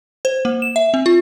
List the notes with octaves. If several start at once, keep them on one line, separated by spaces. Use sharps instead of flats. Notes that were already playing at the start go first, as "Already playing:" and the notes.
C5
A#3
E7
E5
C4
F4